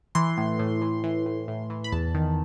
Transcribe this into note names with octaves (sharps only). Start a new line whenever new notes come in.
E3 C6
A2
A2
E3
E3
A2
A2
E3
B5
E2 A5
D#3